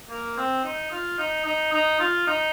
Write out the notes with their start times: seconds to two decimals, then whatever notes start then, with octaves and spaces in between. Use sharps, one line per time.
0.10 A#3
0.37 C4
0.64 D#4
0.91 F4
1.18 D#4
1.45 D#4
1.73 D#4
1.99 F4
2.27 D#4